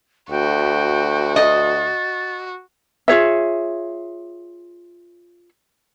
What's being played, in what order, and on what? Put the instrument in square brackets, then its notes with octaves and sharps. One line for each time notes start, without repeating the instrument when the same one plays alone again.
[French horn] D2 [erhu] F#4 [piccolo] G5
[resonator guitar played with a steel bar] D#5 [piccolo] A6
[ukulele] F4 G#4 C#5 E5